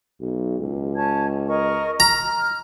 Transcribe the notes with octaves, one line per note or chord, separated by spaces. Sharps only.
B1
C#2
C#4 A5 G#6
A#4 D#5 C#6
A#5 F6